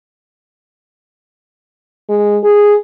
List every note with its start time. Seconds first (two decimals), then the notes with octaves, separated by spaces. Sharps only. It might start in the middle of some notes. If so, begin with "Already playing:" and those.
2.09 G#3
2.43 G#4